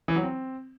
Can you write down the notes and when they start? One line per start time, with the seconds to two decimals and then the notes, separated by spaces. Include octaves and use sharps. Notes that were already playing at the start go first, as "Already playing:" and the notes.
0.08 E3
0.16 F#3
0.23 C4